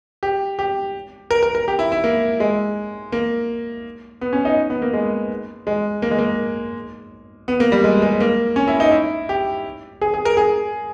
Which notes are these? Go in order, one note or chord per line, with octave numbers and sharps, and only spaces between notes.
G4
G4
A#4
A#4
A#4
G4
E4
E4
A#3
G#3
A#3
B3
C#4
D#4
B3
A#3
G#3
G#3
A#3
G#3
A#3
B3
A#3
G3
G#3
G#3
A#3
C#4
E4
D#4
E4
G4
G#4
G#4
A#4
G#4